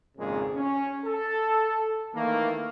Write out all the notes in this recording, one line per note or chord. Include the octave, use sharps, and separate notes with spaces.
G#1 F2 A#2 C#3 G#3
C#4
A4
D#3 E3 A3 A#3